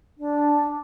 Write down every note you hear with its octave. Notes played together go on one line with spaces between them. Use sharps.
D4